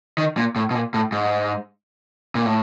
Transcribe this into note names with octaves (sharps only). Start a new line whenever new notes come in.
D#3
A#2
A2
B2
A#2
A2
G#2
A#2
A2